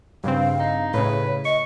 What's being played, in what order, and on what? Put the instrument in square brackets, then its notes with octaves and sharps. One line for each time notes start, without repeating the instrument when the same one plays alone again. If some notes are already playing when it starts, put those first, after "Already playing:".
[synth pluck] G2 C#3 C4 [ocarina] F5
[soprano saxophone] D#4
[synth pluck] A2 C#3 [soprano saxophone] B4 [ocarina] C#5
[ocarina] D#5 [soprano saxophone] C#6